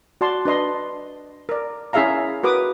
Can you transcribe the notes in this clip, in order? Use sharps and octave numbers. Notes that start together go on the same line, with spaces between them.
F#4 D5 A5 C6
D4 B4 D#5 C6
A#4 D5
C#4 E4 G#4 E5 F5 A#5
F#4 A#4 B4 D6 D#6